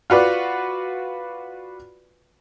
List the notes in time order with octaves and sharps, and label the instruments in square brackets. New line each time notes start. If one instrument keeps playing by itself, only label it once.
[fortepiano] F4 F#4 B4 D5